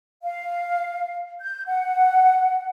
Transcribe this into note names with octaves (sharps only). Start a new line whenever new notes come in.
F5
G6
F#5